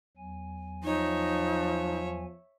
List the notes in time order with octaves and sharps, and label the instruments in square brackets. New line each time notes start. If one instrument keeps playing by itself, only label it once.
[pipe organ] E2 F#3 G#5
[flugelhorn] F3 [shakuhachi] D#4 [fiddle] C#5 E5